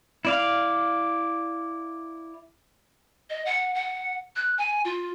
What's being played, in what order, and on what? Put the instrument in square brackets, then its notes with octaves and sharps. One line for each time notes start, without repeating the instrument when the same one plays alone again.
[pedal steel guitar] E4 D5 F5
[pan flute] D#5
F#5
F#5
F#6
G#5
F4